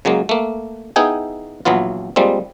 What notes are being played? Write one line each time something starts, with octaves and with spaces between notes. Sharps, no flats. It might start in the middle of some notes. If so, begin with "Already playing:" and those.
C#3 F#3 G#3 A#3
A3 A#3
B3 D#4 E4 G#4 G5 G#5
A#1 E3 F#3 B3 F4
F3 G3 G#3 A#3 C4